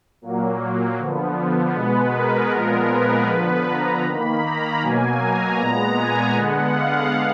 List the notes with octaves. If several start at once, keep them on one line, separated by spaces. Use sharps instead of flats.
A#2 F#3 A#3
D3 F3 B3
B2 G#3 B3 B4
A#4
A#2 F3 G#3 B3 A#4
B4
D3 F3 B3
A#5
D#3 A#3 B5
A#5
B2 F#3 A#3 G#5
A#5
A#2 G#3 B3 A#5
G#5
D3 G#3 B3 F#5
F5